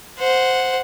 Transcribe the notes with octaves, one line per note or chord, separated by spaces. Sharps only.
C5 F#5